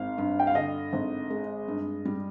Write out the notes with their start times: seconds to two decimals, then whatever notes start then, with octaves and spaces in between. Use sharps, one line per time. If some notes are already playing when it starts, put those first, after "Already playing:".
Already playing: G#1 F5
0.18 G2
0.39 G5
0.47 F5
0.55 D3 D#5
0.93 G#1
1.30 G#3
1.68 G2
2.05 G3